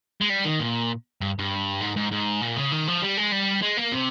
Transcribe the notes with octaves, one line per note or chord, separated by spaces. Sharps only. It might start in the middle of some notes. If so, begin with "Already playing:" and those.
G#3
G3
D#3
A#2
G2
G2
G#2
G#2
G#2
A#2
C#3
D#3
F3
G3
G#3
G3
G#3
A#3
C3